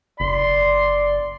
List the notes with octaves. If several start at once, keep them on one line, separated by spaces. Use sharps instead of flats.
F#1 D5 C6